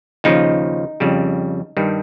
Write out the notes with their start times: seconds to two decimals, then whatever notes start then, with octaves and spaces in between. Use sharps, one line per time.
0.24 D#2 C#3 F3 D#4
1.00 F2 C#3 G3
1.77 G2 D#3 G3